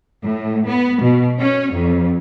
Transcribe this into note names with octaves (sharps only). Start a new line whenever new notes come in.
A2
B3
B2
C#4
F2